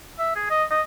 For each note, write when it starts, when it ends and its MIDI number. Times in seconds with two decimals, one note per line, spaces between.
0.19 0.35 76
0.36 0.50 68
0.50 0.64 75
0.71 0.82 75